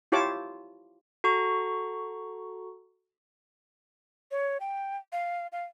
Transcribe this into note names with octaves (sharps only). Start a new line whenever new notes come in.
E4 F4 G4 C#5 A5 D6
F#4 A4 A#5 C#6
C#5
G5
F5
F5